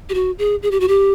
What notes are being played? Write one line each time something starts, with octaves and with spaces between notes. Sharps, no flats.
G4
F#4
G#4
G#4
G4
F#4
G4